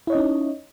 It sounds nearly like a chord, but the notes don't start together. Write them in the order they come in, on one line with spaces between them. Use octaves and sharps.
E4 C#5 D#5 C#4 D#4